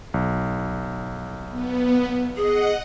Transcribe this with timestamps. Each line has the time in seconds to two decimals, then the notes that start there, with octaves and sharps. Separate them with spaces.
0.14 B1
1.50 B3
2.37 G#4 D#5 F#5